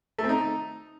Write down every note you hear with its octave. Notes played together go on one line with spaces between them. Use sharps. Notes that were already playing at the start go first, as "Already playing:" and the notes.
A3
C4
D#4